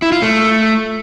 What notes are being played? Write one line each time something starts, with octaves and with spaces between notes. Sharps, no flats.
E4
F4
A3